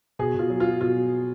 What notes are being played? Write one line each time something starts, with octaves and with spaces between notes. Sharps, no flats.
B2 G#4
B2 F4
F#3
F#3 F4
B2 F4